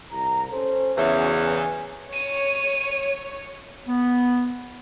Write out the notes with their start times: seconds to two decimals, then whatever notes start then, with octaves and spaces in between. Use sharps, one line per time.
0.11 C2 A#5
0.52 C#4 A4 C5
0.98 E2 C#3 E3 C#4 F#4 C#5
1.46 G#5
2.13 C#5 D#7
3.87 B3